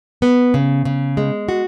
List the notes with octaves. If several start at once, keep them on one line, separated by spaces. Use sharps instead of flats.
B3
C#3
C#3
G#3
F#4